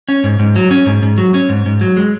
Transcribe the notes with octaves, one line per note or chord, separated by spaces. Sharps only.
C#4
G#2
G#2
F#3
C#4
G#2
G#2
F#3
C#4
G#2
G#2
F#3
G#3